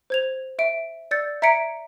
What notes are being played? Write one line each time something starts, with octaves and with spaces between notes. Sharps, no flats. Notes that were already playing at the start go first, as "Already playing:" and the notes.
C5 G#6 F7
E5 D7
D5 E6 G6 A6 C#7
E5 A#5 G#6 B6 C#7 D7